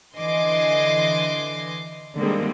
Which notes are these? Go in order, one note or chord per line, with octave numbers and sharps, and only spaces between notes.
D3 E3 D#5 G#5 C6 D6
D3 D#3 G3 G#3 A#3 C4